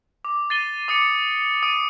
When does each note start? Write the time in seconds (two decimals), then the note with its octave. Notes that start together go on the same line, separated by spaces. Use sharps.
0.25 D6
0.50 A6 C7 D#7 G7
0.88 D6 D#6 A6 C#7
1.63 D#6 A6 D7 D#7